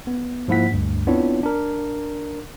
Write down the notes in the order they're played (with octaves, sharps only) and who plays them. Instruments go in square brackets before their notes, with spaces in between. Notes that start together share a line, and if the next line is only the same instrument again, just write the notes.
[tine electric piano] B3
G#2 F3 A#3 E4 F#5 B6
D2 G2
B3 C4 D4 E4 F4 C#5
D4 A#4